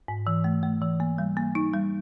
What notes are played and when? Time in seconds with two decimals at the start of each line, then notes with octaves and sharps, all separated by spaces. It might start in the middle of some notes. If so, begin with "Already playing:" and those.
0.08 G#2
0.27 E3
0.44 A3
0.63 A3
0.82 E3
1.00 A#3
1.18 G3
1.37 A#3
1.55 D#4
1.74 G3